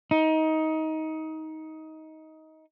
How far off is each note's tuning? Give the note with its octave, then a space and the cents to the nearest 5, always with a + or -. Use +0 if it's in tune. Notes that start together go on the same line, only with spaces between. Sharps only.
D#4 +20